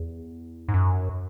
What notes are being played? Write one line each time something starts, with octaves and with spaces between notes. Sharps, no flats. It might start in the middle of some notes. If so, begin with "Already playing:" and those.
Already playing: E2
G#2
F#2